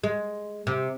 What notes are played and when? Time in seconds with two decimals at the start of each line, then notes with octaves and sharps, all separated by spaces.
0.04 G#3
0.67 C3